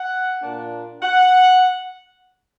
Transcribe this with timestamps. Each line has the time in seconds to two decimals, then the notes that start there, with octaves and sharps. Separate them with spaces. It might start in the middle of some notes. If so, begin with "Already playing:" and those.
Already playing: F#5
0.42 A#2 A#3 D4
1.02 F#5